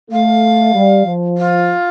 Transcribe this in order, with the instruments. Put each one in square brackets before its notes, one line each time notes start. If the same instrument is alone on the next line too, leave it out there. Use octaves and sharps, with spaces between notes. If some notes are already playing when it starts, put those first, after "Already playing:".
[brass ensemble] A3 [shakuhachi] F5
[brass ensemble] G3
F3
[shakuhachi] F4